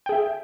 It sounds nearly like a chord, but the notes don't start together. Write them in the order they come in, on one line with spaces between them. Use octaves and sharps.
G5 G#4 E5